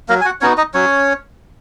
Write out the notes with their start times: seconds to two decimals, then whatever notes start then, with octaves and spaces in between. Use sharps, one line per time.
0.09 F#3 A#3 A#4
0.21 G#5
0.25 F#4 F#5
0.41 B3 C#4 D#4 F#4 C#5
0.58 D#4 D#5
0.74 F#3 C#4 C#5